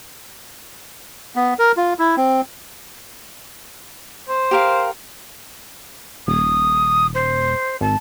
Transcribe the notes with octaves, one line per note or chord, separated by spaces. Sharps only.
B3
A#4
F4
E4
C4
C5
G4 A#4 F5
D#1 D#6
C5
G#1 A5